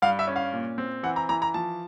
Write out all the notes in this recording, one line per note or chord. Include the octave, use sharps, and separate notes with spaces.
G2 F5
E5
C#4
F5
A#2
C4
E3 F#5
A#5
E3 A#5
A#5
F3 A5